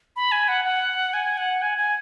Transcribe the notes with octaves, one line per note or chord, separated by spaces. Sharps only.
B5
G#5
F#5
F#5
G#5
F#5
G#5
G#5